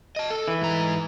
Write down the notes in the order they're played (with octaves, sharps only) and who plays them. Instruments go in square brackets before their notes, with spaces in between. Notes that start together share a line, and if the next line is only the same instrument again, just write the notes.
[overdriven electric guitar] D#5 A5
A4
[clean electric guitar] E3
[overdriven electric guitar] G#2 A#5